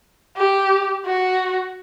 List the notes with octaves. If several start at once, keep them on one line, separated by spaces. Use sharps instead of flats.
G4
F#4